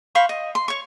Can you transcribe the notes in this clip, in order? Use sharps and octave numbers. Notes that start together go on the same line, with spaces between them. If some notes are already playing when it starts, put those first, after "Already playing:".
C5 F5 B5 C#6
D#5
C6
C#5 C#6